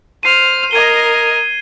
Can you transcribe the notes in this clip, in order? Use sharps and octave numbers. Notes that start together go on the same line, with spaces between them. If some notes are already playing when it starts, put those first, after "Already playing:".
C5 F6 C7 D#7
A#4 D#5 G#6 D#7 G7